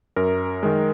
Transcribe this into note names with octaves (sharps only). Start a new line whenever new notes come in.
F#2 A#4
D#3 G#3